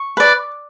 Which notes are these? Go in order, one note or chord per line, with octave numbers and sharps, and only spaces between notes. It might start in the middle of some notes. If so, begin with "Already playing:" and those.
Already playing: C#6
B4 D5